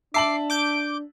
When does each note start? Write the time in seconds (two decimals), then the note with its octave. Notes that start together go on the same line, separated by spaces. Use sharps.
0.14 D4 E5 A5 D6 C7 F#7
0.50 D6 G6 D7